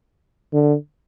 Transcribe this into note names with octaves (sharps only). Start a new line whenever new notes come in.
D3